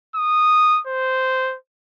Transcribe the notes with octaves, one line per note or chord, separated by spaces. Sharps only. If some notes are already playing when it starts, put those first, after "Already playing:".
D#6
C5